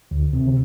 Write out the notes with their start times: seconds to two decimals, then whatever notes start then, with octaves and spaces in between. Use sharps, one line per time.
0.11 D2
0.33 C3